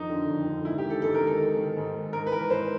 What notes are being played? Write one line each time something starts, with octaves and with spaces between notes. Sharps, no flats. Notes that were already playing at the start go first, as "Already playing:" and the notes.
Already playing: F2 D#3 D#4
D3
F2
D3
G#2 E4
G4
D#3
A4
G#2 A4
A#4
D#3
A4
G#2
D#3
G#2
D#3
G#2 A#4
B4
E3 A#4
G#2 C5